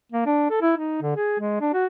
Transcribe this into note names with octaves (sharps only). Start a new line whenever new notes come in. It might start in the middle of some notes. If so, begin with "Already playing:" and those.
A#3
D4
A4
E4
D#4
D3
G#4
G#3
D4
F#4